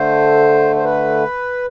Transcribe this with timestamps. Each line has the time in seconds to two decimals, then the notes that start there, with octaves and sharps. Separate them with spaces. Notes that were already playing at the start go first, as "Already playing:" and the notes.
Already playing: D3 A3 C5
0.76 C5
0.84 B4